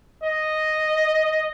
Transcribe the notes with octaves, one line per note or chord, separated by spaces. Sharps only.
D#5